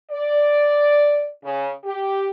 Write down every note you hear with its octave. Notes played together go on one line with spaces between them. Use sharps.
D5
C#3
G4